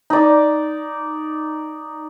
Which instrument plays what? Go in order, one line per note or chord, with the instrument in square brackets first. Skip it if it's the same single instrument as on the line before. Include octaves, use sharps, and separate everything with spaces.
[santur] D#4 D5